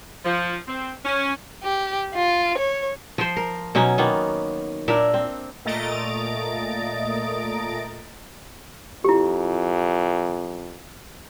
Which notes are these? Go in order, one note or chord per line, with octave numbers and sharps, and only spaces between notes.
F3
C4
C#4
G4
F4
C#5
F3 C5
A#4
B2 F#3 C#4 D#4
D#3 A#3 B3
A#2 D4 A#4 E5
C4
A#2 A3 D#5 A#5 A6 D7
F2 E4 G4